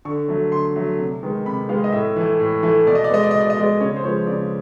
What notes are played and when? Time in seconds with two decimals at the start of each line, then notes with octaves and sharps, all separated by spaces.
0.05 D3 C#6
0.28 F#3 A3
0.52 D3 C6
0.76 F#3 A3
0.99 C3
1.23 D#3 G#3 B3
1.46 C3 B5
1.69 D#3 G#3 B3 F5
1.84 D#5
1.92 A2 E5
2.16 E3 A3
2.39 A2
2.63 E3 A3
2.86 B2 D5
2.95 D#5
3.04 D5
3.10 G#3 B3 D#5
3.23 D5
3.31 B2 D#5
3.41 D5
3.50 D#5
3.57 G#3 B3 D5
3.81 C#3 C#5
3.96 C5
4.04 F3 G#3 B3 C#5
4.27 C#3 D5